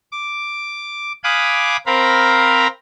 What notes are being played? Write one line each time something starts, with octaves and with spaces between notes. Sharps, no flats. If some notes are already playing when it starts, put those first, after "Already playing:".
D6
F5 G#5 B5 D6 D#6 F#6
C4 A#4 F5 A#5 B5